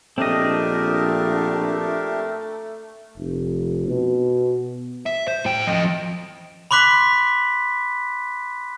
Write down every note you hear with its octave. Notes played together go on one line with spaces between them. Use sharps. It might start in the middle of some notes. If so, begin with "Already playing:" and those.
A#1 A3 C4 D4 G4 A#4 D#5
F1
B2
E5
C5
A2 G5
F3 D#5
B5 C6 D6 F#6 B6